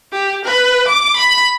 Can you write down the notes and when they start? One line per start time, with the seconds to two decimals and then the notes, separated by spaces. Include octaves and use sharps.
0.12 G4
0.45 B4
0.88 D6
1.16 B5